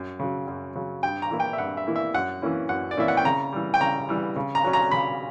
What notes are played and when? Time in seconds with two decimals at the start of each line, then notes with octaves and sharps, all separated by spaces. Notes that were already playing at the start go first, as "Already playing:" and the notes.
Already playing: F#2
0.19 C#3 F#3
0.48 F#2
0.76 C#3 F#3
1.03 G2 G5
1.22 A#5
1.31 E3 A#3 E4
1.40 G5
1.53 E5
1.58 G2 F#5
1.77 E5
1.87 E3 A#3 E4
1.96 E5
2.14 F#2 F#5
2.42 E3 A#3 C#4 E4
2.69 F#2 F#5
2.91 D5
2.97 E3 A#3 C#4 E4 E5
3.08 F#5
3.17 G5
3.25 C#3 A#5
3.53 E3 G3
3.74 G5
3.81 C#3 A#5
4.09 E3 G3
4.36 C#3
4.55 A#5
4.64 F#3 C#4
4.73 A#5
4.91 C#3 B5